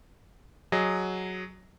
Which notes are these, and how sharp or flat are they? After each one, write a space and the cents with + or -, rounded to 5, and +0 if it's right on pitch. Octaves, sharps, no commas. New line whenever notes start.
F#3 +0 G#4 +0 D#5 +0